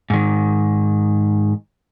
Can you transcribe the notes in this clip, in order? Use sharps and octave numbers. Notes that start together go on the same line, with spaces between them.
G#2 D#3